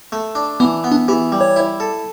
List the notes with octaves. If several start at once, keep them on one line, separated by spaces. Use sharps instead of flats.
A3
D4
E3 B3
B3
D4
E3 G4
G3
C#5
E4
A4